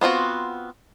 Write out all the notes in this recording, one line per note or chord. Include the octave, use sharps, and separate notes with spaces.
B3 C4 F4 F#4